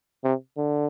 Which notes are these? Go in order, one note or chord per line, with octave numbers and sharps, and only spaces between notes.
C3
D3